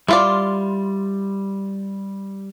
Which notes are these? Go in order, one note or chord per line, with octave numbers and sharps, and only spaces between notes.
G3 E4 F4 D5 C6 F6